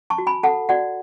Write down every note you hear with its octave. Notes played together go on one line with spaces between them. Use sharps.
A5 C#6
F#4
G#5 B5
A4 F#5 A5
F#4 D5 F#5